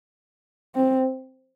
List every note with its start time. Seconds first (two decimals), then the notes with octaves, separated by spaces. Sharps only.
0.75 C4